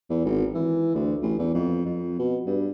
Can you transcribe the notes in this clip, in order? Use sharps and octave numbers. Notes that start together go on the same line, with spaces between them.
E2
G#1
E3
D2
A1
E2
F2
F2
B2
G2